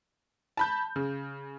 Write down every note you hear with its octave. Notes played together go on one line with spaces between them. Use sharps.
A5 B5 G6
C#3